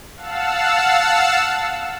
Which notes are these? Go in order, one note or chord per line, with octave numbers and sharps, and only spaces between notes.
F5 F#5 A5 E6